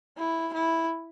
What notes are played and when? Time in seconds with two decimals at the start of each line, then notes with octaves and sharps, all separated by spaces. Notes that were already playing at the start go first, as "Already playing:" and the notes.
0.18 E4
0.54 E4